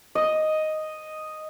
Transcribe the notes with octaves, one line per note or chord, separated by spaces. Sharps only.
D#5